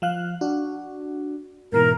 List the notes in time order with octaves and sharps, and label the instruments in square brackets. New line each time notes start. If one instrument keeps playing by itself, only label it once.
[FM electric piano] F3 F5 F#6
D4 F#4
[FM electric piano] G#2 B2 E3 [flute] A#4